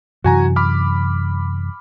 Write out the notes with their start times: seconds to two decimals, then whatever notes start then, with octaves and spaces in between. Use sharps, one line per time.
0.24 F#2 C3 E3 F#4 G#5 A#5
0.56 B5 D6 F6